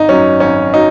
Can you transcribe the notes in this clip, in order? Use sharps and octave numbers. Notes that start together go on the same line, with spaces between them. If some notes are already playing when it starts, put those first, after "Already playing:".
Already playing: G#1 D#4
F#2 F#3 C#4
G#1 C#4
F#3 D#4